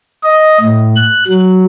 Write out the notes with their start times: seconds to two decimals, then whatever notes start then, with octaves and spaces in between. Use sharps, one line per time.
0.23 D#5
0.61 A2
0.96 F#6
1.28 F#3